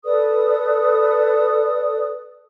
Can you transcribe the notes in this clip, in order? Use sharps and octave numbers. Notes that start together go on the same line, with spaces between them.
A4 B4 D5 D#6